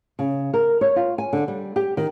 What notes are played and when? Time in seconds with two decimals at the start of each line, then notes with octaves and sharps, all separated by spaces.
0.19 C#3
0.54 A#4
0.81 C#5
0.96 F4
1.18 G#5
1.33 D3
1.48 G3
1.76 G4
1.97 D#3